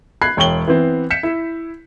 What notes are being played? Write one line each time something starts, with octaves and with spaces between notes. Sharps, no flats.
B5 F#6 G#6 C7
E1 C#5 G5 C#6 F#7 G7
E3 B3 C4
G6 B6 C#7 E7
E4